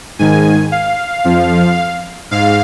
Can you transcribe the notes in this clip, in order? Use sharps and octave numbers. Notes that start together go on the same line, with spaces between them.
G#2 D#3 G#5
F5
F2 F3
G#2 F5